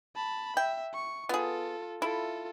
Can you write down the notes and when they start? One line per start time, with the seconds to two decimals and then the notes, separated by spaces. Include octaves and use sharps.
0.16 A5 B5
0.57 E5 G5
0.94 C#6
1.29 B3 F4 G#4 A4
2.02 E4 F4 A4